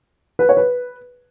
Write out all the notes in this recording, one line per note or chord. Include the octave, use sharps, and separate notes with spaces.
B4
C#5
B4